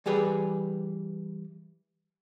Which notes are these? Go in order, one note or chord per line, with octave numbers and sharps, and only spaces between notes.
E3 G3 G4 G#4 B4